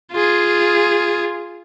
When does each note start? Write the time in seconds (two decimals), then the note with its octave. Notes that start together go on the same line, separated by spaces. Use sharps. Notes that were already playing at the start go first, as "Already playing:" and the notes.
0.13 F4 G#4